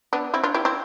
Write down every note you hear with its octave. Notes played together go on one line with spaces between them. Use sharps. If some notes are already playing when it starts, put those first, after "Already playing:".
B3 D4
C4 E4
D4 F4
E4 G4
C4 E4